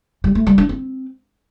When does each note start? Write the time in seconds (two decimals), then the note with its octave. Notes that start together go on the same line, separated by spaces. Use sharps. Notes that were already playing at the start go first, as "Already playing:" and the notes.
0.24 G3
0.35 A3
0.47 G3
0.58 D4
0.69 C4